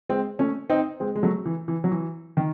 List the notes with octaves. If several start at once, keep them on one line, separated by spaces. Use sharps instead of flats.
G#3 C4
A3 C#4
C4 D#4
G#3 C4
G#3
F#3 A3
E3
E3
F#3
E3
D#3